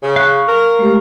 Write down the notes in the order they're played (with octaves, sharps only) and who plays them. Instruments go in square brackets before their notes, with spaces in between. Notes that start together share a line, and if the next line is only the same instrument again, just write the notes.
[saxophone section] C#3
[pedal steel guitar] F5 C#6 [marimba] F#6
[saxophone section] A#4
[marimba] G#3 A3 G4